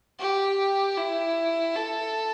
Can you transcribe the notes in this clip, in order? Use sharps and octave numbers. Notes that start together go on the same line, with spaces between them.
G4
E4
A4